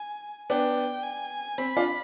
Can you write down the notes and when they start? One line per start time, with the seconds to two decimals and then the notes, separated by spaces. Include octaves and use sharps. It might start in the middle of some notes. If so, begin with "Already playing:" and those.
Already playing: G#5
0.50 B3 D4 G5
1.04 G#5
1.58 C4 B5
1.76 D4 F4